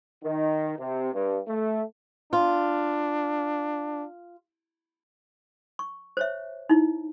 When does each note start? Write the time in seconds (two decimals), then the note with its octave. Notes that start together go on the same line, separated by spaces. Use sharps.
0.23 D#3
0.78 C3
1.13 G2
1.48 A3
2.33 D4 F4
5.79 C#6
6.17 C5 C#5 E5
6.69 D#4 E4